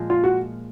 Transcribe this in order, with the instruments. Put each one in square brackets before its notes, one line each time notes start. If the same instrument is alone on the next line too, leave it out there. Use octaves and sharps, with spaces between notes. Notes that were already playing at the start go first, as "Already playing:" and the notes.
Already playing: [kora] A#2 F3 G#3
[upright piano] F4
F#4